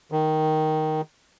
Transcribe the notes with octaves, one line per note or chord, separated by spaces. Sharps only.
D#3